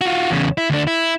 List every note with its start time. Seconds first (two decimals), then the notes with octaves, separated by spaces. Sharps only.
0.01 F4 F#4
0.31 E2 C#3
0.58 E4
0.70 D2 D4
0.87 E4